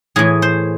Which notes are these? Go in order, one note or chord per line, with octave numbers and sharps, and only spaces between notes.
A2 E3 G#4
C5